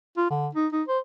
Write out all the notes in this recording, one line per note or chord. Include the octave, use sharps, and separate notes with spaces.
F4
D3
D#4
D#4
C5